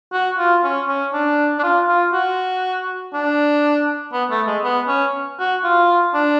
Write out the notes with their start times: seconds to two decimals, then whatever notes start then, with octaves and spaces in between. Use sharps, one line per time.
0.13 F#4
0.38 F4
0.63 C#4
0.88 C#4
1.13 D4
1.59 D4
1.63 F4
1.87 F4
2.13 F#4
3.13 D4
4.13 B3
4.30 A3
4.47 G#3
4.64 B3
4.88 C#4
5.39 F#4
5.64 F4
6.14 D4